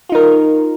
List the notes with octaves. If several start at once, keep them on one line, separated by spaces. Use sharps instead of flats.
D#4 F4 A#4